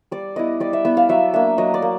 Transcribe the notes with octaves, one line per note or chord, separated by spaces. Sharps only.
G3 D5
B3 E4 D#5
G3 D5
E5
B3 E4 E5
F5
F#3 E5
A#3 D4 E5
F#3 D#5
D5
A#3